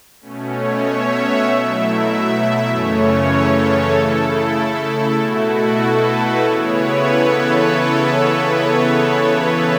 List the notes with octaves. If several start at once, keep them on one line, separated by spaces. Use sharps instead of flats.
B2 A3 C#4
C#5
E5
F#5
B2 F#3 A3 E4 E5
E5
F#2 C#3 E3 A3 C#4 C#5
A4
C#3 A3 E4 A4
B2 A3 E4 F#4
A4
B4
C#3 E3 B3 E4 C#5
B4
A4
A4